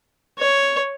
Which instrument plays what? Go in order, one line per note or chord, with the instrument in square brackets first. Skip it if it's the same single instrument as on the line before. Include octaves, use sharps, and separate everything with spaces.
[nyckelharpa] C#5